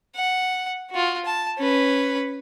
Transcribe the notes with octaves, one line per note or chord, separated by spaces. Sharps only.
F#5
F4 F#4
A5
C#4 B4